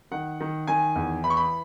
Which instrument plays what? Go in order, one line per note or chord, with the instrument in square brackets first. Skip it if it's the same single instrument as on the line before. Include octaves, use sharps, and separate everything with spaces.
[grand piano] D#3 F#5
D#3
D#3 G#5
E2
E3 B5
C#6
B5